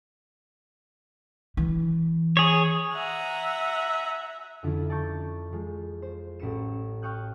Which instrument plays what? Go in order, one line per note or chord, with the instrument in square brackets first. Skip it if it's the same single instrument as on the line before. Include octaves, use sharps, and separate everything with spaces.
[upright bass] E3
[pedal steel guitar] G#4 C#5
[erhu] E5 [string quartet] F#5 G#5 A#5
[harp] F2 D3 F3 F#3 C#4 E4
D5 A5 A#5 C#6 G6
F3 G#3
C5
A1 F#3 A#4 B4 C#7 E7
F5 G5 C#6 D#6 F#6 G6